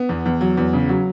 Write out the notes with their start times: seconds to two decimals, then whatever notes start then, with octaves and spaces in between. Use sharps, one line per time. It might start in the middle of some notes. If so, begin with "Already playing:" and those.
Already playing: B3
0.09 E2
0.26 E2
0.41 F#3
0.57 E2
0.73 C#3
0.89 F#3